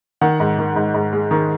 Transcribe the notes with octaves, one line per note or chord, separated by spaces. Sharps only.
D#3 F#5
G#2
D#3
G#2
G#2
G#3
D#3